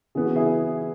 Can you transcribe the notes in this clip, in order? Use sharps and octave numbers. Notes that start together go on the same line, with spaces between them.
C#3 E3 B3 G#4
F#4
E4 G#4